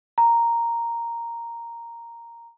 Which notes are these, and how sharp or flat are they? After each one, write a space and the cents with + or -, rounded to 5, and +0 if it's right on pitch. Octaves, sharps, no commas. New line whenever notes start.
A#5 -5